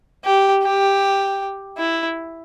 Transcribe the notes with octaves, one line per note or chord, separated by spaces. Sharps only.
G4
G4
E4